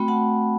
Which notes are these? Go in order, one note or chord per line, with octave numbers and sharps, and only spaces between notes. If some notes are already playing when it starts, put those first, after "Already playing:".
Already playing: A3 C4 F#4 G5 B5
F#5 A5